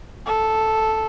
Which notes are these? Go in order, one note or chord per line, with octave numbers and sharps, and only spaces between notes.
A4